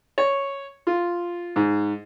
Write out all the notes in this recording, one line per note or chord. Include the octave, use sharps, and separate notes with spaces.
C#5
F4
G#2